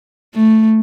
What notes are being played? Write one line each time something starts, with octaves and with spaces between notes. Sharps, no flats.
A3